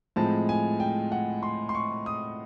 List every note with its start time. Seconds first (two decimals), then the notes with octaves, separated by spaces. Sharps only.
0.16 A2 F3 G#3 C4 A5
0.49 G#5
0.80 G5
1.12 F#5
1.43 C6
1.69 C6
1.75 C#6
2.06 D#6